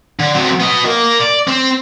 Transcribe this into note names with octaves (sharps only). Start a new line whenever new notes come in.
D3
F#3 C4
B3 D#5
A#3 A#4
D5
C4